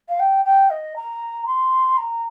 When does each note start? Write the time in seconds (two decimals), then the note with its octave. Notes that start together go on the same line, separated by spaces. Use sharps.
0.09 F5
0.20 G5
0.45 G5
0.70 D#5
0.96 A#5
1.46 C6
1.98 A#5